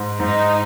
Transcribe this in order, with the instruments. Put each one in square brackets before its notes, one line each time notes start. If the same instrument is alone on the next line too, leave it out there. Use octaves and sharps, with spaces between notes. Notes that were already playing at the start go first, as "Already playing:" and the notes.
Already playing: [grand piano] G#2
[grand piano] G#2 [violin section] D#4